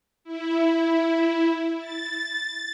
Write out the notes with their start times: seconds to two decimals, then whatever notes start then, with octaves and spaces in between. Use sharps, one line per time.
0.24 E4
1.78 A6